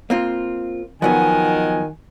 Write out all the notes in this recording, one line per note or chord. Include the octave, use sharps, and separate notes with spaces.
A#3 C4 F4
D#3 F3 F#3 B3 D#5 F#5 G#5